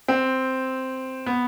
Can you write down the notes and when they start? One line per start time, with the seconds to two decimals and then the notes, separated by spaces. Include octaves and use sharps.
0.08 C4
1.26 B3